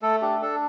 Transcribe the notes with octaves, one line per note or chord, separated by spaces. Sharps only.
A3 A4
D4 G4
D4 A4